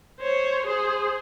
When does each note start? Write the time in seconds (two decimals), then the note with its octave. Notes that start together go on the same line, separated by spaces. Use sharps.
0.20 C5 C#5
0.66 G#4 C5